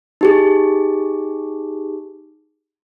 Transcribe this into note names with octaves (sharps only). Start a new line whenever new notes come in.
D#4 G4 G#4